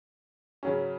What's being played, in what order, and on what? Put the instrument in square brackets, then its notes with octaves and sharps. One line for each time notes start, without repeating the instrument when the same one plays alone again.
[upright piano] C#3 F#3 C#4